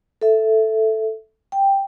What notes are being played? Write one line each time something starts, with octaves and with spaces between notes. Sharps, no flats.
A4 E5
G5